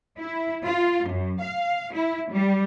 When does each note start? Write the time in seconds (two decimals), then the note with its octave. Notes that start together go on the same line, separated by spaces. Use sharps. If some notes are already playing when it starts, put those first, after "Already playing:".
0.19 E4
0.63 F4
1.07 F#2
1.40 F5
1.93 E4
2.31 G3